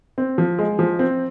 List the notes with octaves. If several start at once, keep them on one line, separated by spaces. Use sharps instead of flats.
C4
F3
G#3
F3
C4